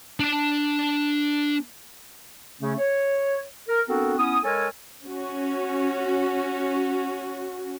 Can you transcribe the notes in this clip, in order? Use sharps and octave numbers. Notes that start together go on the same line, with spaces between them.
D4 A5
C#3 A3 C#4
C#5
A#4
B3 C4 D4 F#4 A4 A#4
B3 C#4 E4 D#6
G#3 A4 A#4 C#5 G#5
C#4 F#4